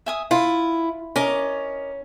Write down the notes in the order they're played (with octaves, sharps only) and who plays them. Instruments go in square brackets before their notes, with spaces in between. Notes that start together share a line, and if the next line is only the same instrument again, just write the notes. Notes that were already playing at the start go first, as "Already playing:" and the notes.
[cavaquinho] E5 G#5 D#6
[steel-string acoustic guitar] E4 [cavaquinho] F4
[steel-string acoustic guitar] C#4 [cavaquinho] A#4 D#5 D6